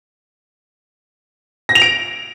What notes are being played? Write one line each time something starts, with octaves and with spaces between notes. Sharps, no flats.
A#6
F7
D7